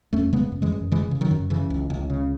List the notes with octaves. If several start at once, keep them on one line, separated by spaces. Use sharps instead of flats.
E2 A3 C#4
C#3 G#3 B3
F#2
E3 G#3
F#2
C#3 E3 G#3
C#3
D#3 F#3
F#2
C#3 E3
C#2
C#2
C#3